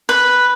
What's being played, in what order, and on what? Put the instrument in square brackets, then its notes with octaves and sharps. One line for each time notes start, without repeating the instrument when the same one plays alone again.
[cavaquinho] B4